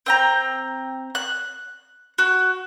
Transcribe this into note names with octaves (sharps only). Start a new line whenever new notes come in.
C4 G5 A#5
F#6
F#4